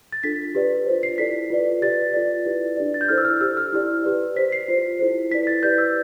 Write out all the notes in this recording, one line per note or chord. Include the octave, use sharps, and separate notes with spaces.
A6
D4 F4 A4 B6
G4 B4 D5
F4 C5
C7
E4 A4 D5 B6
F4 B4 D5
G4 B4 D5 A6
F4 A4 D5
E4 G4 B4 D5
D4 G4 D5
A6
G6
E4 A4 C5 F6
E6
F6
G4 C5 E6
F6
E4 G4 D5
G4 B4 D5
G4 C5 B6
C7
F4 C5
E4 A4 C5
E4 B4 D5 B6
A6
E4 G4 B4 D5 G6
E6